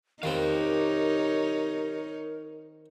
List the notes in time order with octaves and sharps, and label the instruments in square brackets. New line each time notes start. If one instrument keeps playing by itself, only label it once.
[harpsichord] D#3 C4 [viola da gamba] D#4 C#5 [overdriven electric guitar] G4 F5 [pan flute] A#4